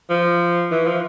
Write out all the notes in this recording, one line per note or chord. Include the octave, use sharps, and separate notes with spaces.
F3
E3
F3